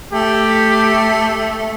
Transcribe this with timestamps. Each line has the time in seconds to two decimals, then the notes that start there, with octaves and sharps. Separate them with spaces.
0.13 A3 G4